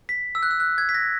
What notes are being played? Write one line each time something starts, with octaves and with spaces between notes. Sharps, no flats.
B6
E6
F#6
E6
F#6
G#6
B6
A#6